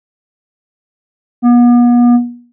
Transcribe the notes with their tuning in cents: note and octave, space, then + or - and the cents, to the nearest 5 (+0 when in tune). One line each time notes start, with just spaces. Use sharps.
B3 -40